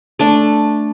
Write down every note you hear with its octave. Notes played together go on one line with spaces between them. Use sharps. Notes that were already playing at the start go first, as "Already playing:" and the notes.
A3 D4